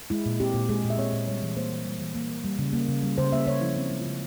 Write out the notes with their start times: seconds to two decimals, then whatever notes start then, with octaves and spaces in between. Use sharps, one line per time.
0.10 G#3 E4
0.26 A#2
0.40 C4 G4
0.54 A#2
0.69 G#3 G#4
0.84 A#2
0.90 E5
0.98 C4 C#5
1.13 A#2
1.28 G3 C#5
1.42 E3
1.56 A#3 C5
1.72 E3
1.86 G3
2.01 E3
2.15 A#3
2.30 E3
2.45 G3
2.59 C#3
2.73 A#3
2.88 C#3
3.03 G3
3.18 C#3 C5
3.32 A#3 E5
3.47 C#3 C#5
3.61 F3 E4
3.77 C4
3.91 G#3
4.01 F4
4.06 C#3